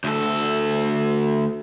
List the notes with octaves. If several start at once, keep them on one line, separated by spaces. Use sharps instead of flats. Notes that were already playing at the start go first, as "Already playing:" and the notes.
D2 A4